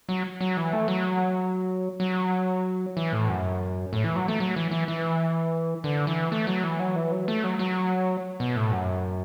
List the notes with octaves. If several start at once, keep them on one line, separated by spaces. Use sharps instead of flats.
F#3
F#3
E3
A3
F#3
F#3
E3
A2
F#2
A2
E3
F#3
A3
F#3
E3
E3
E3
D3
E3
A3
F#3
E3
F#3
E3
F#3
A3
F#3
F#3
B2
A2
F#2